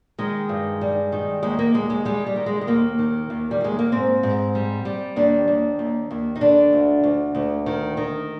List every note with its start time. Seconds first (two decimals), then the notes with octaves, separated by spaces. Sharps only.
0.18 D#3 G#3
0.49 G2
0.81 G3
1.12 D#3
1.43 D#2 G#3
1.59 A#3
1.74 D#2 G#3
1.90 G#3
2.05 G3 G#3
2.26 G3
2.36 D#3
2.46 G#3
2.61 G#3
2.67 D#2 A#3
2.99 D#3
3.30 D#2
3.51 G3
3.61 D#2 G#3
3.79 A#3
3.92 G#2 C4
4.23 G#2
4.55 G3
4.85 G3
5.16 D#2 D4
5.48 D#2
5.79 D#2
6.11 D#2
6.36 D#4
6.41 D3 D4
6.73 D2
7.04 D2
7.35 D2
7.66 D#3
7.97 D#3